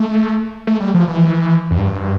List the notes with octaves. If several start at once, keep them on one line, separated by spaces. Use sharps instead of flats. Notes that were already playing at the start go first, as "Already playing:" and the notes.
Already playing: A3
A3
G3
F3
E3
F2
G2